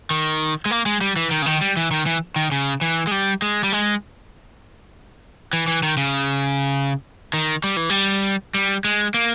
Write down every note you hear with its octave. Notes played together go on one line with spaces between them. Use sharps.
D#3
G#3
A#3
G#3
G3
E3
D#3
C#3
D#3
G3
E3
D#3
E3
D#3
C#3
E3
G#3
G3
G#3
G3
G#3
E3
E3
D#3
C#3
D#3
G3
E3
G3
G3
G#3
A#3